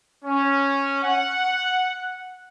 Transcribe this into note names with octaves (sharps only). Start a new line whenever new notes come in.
C#4
F#5